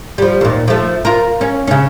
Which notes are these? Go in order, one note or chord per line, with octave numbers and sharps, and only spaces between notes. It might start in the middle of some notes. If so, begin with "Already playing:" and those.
F3 G3
D#2 A#2
F3 A3
F4 A#4
C#4
C#3 C#4